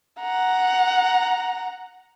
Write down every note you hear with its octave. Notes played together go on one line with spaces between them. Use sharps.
F#5 A#5